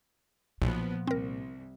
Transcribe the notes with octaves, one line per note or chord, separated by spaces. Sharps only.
B1 A#2 F3 B3
C2 C4 A#4